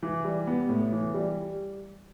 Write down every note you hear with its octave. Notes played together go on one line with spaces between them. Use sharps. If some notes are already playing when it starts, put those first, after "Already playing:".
E3
G3
B3
A2
E3
G3